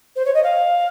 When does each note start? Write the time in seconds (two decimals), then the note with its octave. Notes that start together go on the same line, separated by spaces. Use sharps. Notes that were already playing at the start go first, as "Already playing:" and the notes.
0.16 C5
0.25 C#5
0.34 D#5
0.43 F5